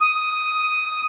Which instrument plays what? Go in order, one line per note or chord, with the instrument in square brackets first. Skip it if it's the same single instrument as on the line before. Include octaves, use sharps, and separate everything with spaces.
[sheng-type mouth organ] D#6